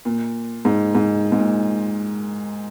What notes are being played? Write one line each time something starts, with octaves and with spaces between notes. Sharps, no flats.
A#2
G#2
G#2
G#2
A#2